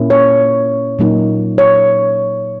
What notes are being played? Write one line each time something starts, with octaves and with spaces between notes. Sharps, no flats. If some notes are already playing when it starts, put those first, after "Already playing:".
Already playing: A#2 A#3 C#4 E4
C#5
A#2 F#3 A#3 D#4
C#5